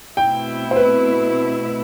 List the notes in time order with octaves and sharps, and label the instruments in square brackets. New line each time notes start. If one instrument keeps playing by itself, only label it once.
[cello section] B2 A3 C4 E4 [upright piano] G5
[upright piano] C5
B4